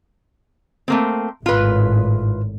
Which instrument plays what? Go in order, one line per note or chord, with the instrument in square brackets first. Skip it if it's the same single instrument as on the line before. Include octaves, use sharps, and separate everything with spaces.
[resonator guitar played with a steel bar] A3 A#3 C4
[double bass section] G#1 A2 [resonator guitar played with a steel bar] F4 B4